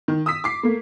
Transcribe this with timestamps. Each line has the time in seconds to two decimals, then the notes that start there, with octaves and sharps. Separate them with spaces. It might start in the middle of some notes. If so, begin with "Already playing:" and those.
0.08 D#3
0.26 D#6 E6 B6
0.44 D6 C7
0.63 A3 A#3